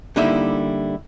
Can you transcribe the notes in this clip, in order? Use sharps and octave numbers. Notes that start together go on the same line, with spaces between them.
D3 G3 A#3 D#4 E4 E5